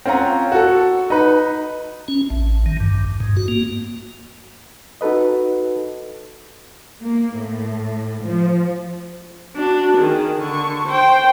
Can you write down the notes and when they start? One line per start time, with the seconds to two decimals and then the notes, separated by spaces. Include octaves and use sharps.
0.06 C4 C#4 F4 F#5 A#5
0.52 F#4 A4
1.10 D#4 B4
2.08 C#4
2.30 A1
2.66 D#3
2.80 G2
3.20 G#2
3.37 F#4
3.48 A#3
5.01 D#4 F#4 A4 B4 D#5
7.01 A#3
7.35 A2
8.23 F3
9.56 D4 F#4
9.98 D#3 G#4
10.40 D3 C#6
10.88 C5 G5